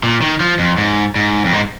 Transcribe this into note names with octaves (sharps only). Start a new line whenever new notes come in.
A#2
D#3
F3
F2
G#2
G#2
F2
G#2